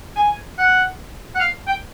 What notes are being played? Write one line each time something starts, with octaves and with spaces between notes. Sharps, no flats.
G#5
F#5
F#5
F5
G5